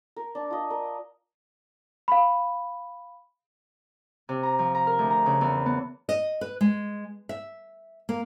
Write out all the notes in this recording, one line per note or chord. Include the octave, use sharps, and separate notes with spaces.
A#4
D4
F4 D#5
A#4
F5 B5
C3
A#5
F3
A#5
A#4
D2
A#5
C#3
E2
B3
D#5
B4
G#3
E5
A#3